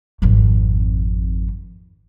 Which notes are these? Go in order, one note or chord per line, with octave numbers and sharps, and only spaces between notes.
G#1 F2